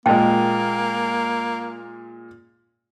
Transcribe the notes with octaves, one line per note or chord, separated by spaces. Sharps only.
A#2 G#3 A#3 G5 A5